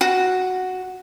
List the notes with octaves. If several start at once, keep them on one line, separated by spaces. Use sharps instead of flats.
F#4